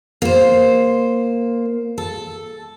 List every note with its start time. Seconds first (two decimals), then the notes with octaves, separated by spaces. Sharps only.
0.22 A#3 C5
1.98 A4